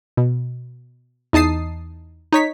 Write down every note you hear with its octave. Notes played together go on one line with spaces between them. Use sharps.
B2
E2 D#4 A5 D#6 C7
D#4 C#5 B6